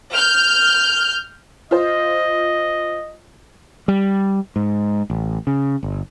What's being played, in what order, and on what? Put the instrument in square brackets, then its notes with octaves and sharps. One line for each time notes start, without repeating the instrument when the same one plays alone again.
[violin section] F6 G6
[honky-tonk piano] F4 C5 [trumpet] D#5
[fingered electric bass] G3
G#2
A1
C#3
G1